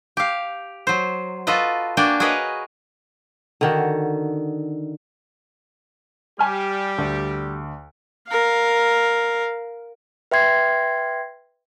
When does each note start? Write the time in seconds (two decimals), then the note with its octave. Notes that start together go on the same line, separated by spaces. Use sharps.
0.17 G4 F5
0.87 F#3 C5
1.47 F4 F#4 A4 B4 D#5
1.97 A#3 D4 F#4 G5 G#5
2.20 F#4 G#4 A#4 B4 C#5 D#5
3.61 D3 D#3 F#4
6.39 G3 G4 G#5 F6
6.98 D2
8.28 A#4 F5
10.31 B4 E5 G5 C6 G#6 C7